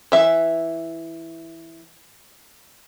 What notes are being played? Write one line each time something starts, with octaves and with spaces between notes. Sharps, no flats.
E3 E5